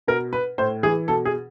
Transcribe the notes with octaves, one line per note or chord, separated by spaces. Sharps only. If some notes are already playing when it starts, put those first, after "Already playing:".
B2 A#4
B4
A2 C5
E3 G#4
B2 A4
G#4